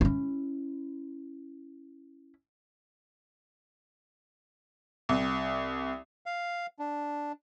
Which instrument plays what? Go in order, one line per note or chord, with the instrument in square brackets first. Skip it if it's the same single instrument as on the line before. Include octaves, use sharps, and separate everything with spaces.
[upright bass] C#4 E4
[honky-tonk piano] C2
[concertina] F5
D4